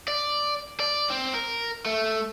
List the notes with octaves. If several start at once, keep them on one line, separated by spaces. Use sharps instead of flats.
D5
D5
C4
A#4
A3